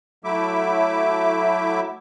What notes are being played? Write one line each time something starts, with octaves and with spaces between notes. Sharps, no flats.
F#3 A3 E4 E5 D6